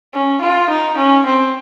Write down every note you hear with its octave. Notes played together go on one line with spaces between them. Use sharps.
C#4
F4
D#4
C#4
C4